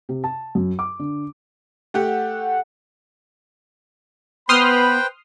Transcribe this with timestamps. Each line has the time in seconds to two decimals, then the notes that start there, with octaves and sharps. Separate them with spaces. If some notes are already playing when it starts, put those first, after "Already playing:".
0.09 C3
0.24 A5
0.55 F#2
0.79 D6
0.99 D3
1.94 A3 G4 F#5
4.49 B3 B4 C5 G5 B5 C6 D#6 F6